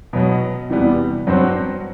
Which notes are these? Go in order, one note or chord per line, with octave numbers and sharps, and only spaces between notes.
B2 F#3 B3
E2 C3 E3 G3 B3
G2 F#3 C4 F#4 C5